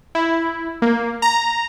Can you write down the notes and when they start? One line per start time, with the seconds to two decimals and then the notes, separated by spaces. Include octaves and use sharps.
0.15 E4
0.82 A#3
1.22 A#5